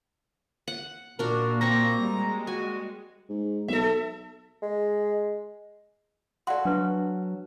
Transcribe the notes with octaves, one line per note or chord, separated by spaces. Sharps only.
F#5
A#2 D4 F#4 A#4
A#3 C4 A#5 C#6
G3 G#3
F#4 G#5
G#2
B1 A4 E5
G#3
F#4 A4 D5 F5 C6
F#3 D4 B4 C#6